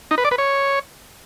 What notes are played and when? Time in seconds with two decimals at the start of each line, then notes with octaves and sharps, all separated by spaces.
0.11 D#4
0.18 B4
0.25 D5
0.31 B4
0.38 C#5